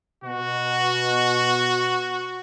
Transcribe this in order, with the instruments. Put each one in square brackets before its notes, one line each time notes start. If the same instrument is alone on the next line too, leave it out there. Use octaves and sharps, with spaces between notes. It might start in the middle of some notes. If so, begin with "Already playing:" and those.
[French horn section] B2 [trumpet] F#4